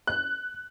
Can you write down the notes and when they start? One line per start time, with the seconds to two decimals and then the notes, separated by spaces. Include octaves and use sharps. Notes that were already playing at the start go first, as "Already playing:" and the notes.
0.07 F#6